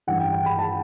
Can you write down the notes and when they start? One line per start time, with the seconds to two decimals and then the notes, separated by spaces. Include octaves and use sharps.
0.07 A1 G2 E3 F#5
0.20 G5
0.33 G5
0.46 B5
0.59 A5